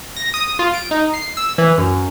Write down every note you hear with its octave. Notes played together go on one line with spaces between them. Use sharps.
A#6
D#6
F4
D7
D#4
C7
E6
E3
F#2